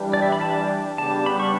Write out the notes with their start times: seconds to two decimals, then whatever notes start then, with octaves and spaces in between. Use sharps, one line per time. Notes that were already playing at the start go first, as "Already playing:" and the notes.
Already playing: E3 G3 D4 G4
0.13 D5
0.22 E5
0.32 B5
0.41 A5
0.98 C#3 G3 B3 D4 G4 A5
1.26 B5
1.40 C#6